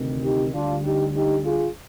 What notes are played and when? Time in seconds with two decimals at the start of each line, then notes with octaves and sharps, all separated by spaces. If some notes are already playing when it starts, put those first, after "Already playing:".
Already playing: D2 C3 D#3
0.23 D#4 G4
0.53 D2 D3 G3 D4 F4
0.84 D#4 G4
1.14 D#4 G4
1.44 F4 G#4